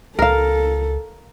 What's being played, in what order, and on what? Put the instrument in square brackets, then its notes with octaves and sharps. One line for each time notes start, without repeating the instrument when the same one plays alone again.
[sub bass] C#2 [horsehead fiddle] A4 [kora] A#4 F5